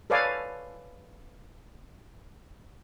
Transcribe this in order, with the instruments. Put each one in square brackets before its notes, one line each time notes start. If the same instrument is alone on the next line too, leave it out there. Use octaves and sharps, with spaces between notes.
[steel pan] A4 B4 C#5 D5 F5 G#5